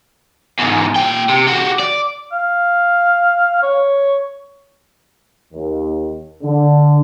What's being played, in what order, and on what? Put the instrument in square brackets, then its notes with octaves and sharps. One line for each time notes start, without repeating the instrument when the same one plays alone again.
[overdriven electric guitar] E2 G#2
A#2 G5
C3
F#4 G4
D5
[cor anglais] F5
C#5
[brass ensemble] D#2
D3